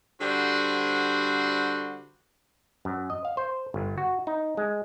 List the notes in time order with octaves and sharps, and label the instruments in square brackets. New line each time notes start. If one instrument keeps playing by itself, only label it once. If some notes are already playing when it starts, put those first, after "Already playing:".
[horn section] D3 G3 F#4 C5
[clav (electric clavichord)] F#2
D#5
F5
C5
G1
F#4
D#4
G#3